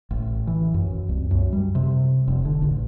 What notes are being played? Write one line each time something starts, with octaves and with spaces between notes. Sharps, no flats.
A1
E3
F#2
C2
F#2
G3
C3
F1
D3
A1